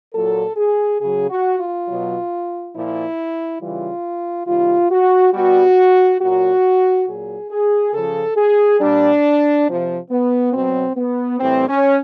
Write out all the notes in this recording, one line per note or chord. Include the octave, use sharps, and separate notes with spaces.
A#2 F#3 A4
G#4
C#3 F#3 G#4
F#4
F4
B2 F#3
A#2 F3 E4
C#3 E3 G3 F4
C3 D#3 G3 F4
F#4
B2 G3 F#4
A#2 F#3 F#4
A#2 F#3 G#4
G#4
C#3 F3 A4
G#4
A#2 G3 D4
C3 F3
B3
B2 F#3 C4
B3
A2 E3 G3 C4
C#4